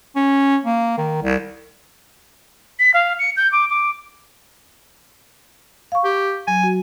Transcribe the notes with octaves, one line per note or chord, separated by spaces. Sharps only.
C#4
A#3
D#3
C2
B6
F5
C#7
G6
D6
D6
F5 C#6
G4
F#3 G#5
F#4